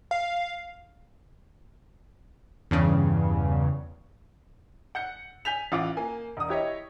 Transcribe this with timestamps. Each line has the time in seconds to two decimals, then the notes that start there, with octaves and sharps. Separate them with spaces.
0.11 F5
2.71 E2 G2 C#3
4.95 F#5 G6 C#7
5.45 G#5 G6 B6 F7
5.72 A1 F4 F#5 D6
5.97 A#3 G#5
6.37 E1 D#6
6.49 E4 G4 C#5 D#5